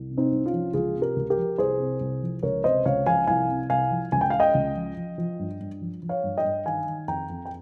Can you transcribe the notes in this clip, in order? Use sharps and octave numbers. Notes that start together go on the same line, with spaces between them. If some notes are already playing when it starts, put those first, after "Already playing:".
Already playing: C2
C3
C4 D#4
C2
C#4 F4
F3
C#2 F4 G#4
C3
G4 A#4
C#2
G4 A#4
F3
C2 G#4 C5
C3
C2
F3
C#2 A#4 C#5
C3 C5 D#5
C#2 C#5 F5
F3 F5 G#5
C2 F5 G#5
C3
C2 F5 G#5
F3
C#2 G#5
G5
C#3 F5
D#5 G5
C#2
F3
F3
F3
G2
G2
F3
F3
C#5 F5
G2
D#5 G5
G2
D#3 F5 G#5
D#3
F2 G5 A#5
F2
G5